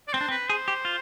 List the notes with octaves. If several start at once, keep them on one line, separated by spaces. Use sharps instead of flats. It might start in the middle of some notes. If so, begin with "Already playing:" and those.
D5
C4 C5
D4
C4 B4
G#4 C5
G4
F4